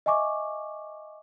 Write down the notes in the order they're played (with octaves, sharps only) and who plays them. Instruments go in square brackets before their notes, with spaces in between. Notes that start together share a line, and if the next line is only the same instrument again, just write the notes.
[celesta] D#5 E5 G#5 C#6 D6